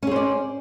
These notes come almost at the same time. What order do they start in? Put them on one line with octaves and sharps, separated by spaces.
C#4 G#4 C5 D5